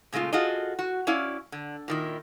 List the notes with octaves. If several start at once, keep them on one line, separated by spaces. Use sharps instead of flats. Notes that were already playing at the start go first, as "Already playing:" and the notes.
A#2 C#3 G#3 A3 F4
F4 F#4 G#4 A4 D#5
F#4
C#4 E4 D5 F5
D3
A#2 D#3 E4